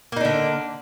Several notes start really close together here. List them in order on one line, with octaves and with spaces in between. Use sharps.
A#3 D#4 D4 D3